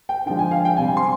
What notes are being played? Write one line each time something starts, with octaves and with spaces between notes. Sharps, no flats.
G5
D3 F3 G#3 D4 G5
G#5
F5
G5
C3 G3 C4 G#5
C6